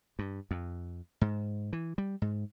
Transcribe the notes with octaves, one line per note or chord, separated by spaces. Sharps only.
G2
F2
G#2
E3
G3
G#2